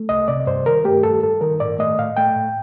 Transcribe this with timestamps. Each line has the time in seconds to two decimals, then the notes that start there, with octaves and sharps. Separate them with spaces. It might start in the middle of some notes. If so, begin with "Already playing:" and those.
Already playing: A3
0.09 C2 D#5
0.28 C3 D5
0.47 G2 C5
0.66 D#3 A#4
0.85 A3 G4
1.03 G2 A4
1.23 G2 A4
1.41 D#3 A#4
1.60 A2 D5
1.79 A3 D#5
1.98 A2 F5
2.17 A3 G5
2.35 A2